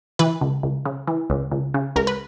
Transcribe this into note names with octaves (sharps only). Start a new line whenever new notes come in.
E3 B4
C#2
C#2
C#3
E3
C#2
C#2
C#3
C#2 A#4
B4